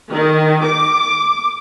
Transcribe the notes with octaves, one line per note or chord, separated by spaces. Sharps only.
D#3
D6